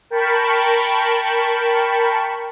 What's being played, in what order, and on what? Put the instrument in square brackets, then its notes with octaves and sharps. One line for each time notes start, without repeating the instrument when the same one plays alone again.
[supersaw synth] A#4 G5 A5 B5 C#6